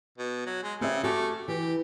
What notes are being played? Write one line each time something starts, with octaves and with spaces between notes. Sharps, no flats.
B2
F#3
G#3
C#3 C4 G4 E5
A3 F#4 G4
E3 G4